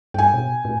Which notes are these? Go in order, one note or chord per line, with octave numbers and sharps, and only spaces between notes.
G2 G5 G#5
B2
A2